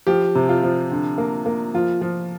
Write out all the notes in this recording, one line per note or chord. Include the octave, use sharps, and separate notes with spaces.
F3 G4
C3
F4
F3
D3
A#3
A#3
F3 F4
F3